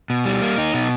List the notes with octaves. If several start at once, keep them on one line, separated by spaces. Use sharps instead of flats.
B2
G3
A#3
D#4
B2